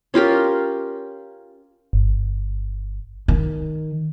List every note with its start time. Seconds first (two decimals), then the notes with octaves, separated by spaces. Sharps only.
0.14 C#4 F4 G4 A#4
1.93 G1
3.28 D#3